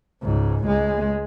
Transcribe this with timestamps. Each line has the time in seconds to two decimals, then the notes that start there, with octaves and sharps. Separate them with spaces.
0.23 C#2 G#2
0.66 C#2 G#3